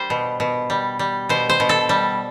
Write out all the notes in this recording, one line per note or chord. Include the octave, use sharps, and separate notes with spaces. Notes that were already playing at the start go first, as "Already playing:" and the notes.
Already playing: G3 C5
B2
B2
G3
G3
B2 C5
C5
B2
A4
G3